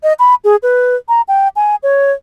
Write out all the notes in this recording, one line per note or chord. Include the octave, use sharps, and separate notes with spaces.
D#5
B5
G#4
B4
A#5
G5
G#5
C#5